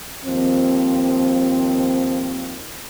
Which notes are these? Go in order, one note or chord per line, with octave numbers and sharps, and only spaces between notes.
D#2 D#3 F3 C4